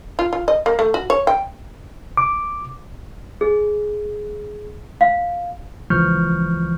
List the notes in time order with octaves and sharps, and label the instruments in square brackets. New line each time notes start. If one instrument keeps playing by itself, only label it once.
[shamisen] F4
F4
D#5
A#3
A3
F#4
C#5
G5
[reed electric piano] D6
[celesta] G#4
F5
[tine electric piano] C#2 E3 F3 C#6 F6 G6